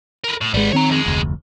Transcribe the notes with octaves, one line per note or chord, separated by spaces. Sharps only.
A#4 B4
A2
G#1 G3 G#3 B3
D#3 C4 C#5 A#5
F2 G#3
F1 D2